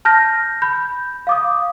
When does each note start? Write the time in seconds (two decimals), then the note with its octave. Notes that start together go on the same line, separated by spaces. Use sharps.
0.05 A5 F6 G6 A#6
0.62 B5 G6
1.27 F5 D6 D#6